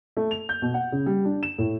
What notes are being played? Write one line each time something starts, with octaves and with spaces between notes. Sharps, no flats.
A3
F7
G6
B2
F#5
C#3
G3
D4
E7
A2